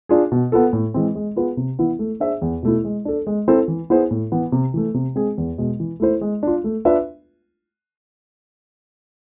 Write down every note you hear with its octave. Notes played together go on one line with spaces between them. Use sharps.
D4 F4 G#4
B2
B3 F4 A4
A2
E3 G#3 C4
G#3
B3 F4 G#4 B4
C3
E3 B3 E4
A3
D4 G#4 C5 E5
E2
B2 A3 E4
G#3
D4 A4
G#3
C4 E4 A4 C5
E3
B3 E4 G#4 C5
A2
E3 B3
C3
E3 A3
C3
G#3 C4 G#4
E2
B2 G#3
E3
A3 E4 A4 C5
G#3
D4 F4
A3
D4 F4 B4 E5